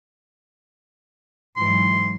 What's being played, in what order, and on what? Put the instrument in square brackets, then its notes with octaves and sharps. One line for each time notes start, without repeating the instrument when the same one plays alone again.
[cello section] G#2 E3 F#3 [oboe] C6